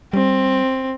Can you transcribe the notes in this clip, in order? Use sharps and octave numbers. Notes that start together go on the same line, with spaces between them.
G3 C4